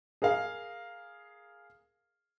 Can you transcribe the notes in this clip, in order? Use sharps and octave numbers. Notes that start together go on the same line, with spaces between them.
G#4 A#4 F5